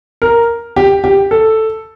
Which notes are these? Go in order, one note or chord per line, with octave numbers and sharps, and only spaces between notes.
A#4
G4
G4
A4